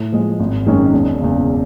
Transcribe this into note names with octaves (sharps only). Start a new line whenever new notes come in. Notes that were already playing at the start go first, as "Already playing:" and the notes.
Already playing: A2
F3 G#3
G#1
F#2 D#3 G#3 C#4
E1
E2 C#3